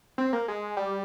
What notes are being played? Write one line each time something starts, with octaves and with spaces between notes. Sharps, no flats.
C4
A#3
G#3
G3